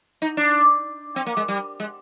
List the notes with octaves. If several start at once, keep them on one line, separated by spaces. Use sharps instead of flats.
D#4
D4
C4
A#3
G#3
G3
G#3